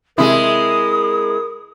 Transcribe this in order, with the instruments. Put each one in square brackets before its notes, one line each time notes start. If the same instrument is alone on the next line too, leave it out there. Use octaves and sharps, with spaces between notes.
[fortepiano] C3 [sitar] G#3 E4 [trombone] A#4 [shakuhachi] D#6